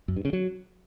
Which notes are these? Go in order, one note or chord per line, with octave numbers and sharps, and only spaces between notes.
F#2
G2
C#3
F#3